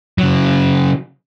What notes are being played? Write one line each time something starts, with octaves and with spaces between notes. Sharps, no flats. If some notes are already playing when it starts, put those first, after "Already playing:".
C#3 F#3